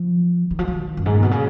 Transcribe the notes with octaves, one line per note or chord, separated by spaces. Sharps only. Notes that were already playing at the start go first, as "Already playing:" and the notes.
Already playing: F3
D#3
F3
D#3
F#2
G#2
A#2
B2
C#3